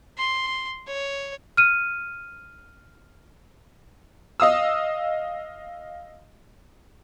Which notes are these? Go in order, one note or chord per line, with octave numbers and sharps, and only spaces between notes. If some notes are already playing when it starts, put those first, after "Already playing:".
C6
C#5
F6 D#7
D#5 F5 D#6 E6